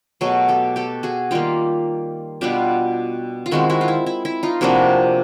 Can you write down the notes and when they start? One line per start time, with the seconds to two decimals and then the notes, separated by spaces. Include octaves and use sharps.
0.21 B2 F#3 A3 F#4 G#4
0.48 G4 A4
0.76 G4 A4
1.03 F#4 G#4
1.31 D#3 G3 A#3 F4 G4
2.41 B2 G3 B3 D4 F4 G4
3.46 F4
3.51 D#3 G#3 C4 E4 F#4
3.70 E4 F#4
3.81 F4
3.88 E4
4.06 E4
4.25 E4
4.43 D#4 F4
4.61 C3 F3 A#3 D4 E4 F#4